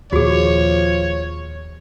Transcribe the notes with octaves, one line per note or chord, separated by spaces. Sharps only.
D#2 A#2 F3 F#4 G#4 C#5